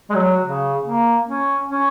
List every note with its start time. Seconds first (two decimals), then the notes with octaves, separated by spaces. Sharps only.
0.10 G#3
0.15 F#3
0.43 C#3
0.86 A#3
1.28 C#4
1.71 C#4